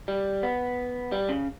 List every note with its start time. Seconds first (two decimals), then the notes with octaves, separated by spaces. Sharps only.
0.08 G3
0.43 B3
1.12 G3
1.29 C#3